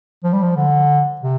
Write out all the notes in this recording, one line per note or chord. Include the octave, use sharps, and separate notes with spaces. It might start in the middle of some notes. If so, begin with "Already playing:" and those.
F3
G3
F3
D3
C3